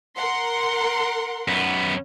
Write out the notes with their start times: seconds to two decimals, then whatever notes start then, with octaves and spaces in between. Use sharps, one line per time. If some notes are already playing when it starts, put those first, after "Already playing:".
0.15 A#4 F#5 C6
1.48 F#2 B3